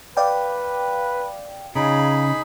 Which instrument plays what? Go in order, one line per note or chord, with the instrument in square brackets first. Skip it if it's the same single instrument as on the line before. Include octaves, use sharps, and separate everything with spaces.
[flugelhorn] B4 [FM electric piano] D5 F5 G5
[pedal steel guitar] C#3 [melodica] D#4 G#4 B5 [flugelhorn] F4